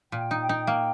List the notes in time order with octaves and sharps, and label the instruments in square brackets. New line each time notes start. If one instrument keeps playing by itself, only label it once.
[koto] A#2 [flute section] G5
[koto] D#4
[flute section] G5
[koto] D#4
A#3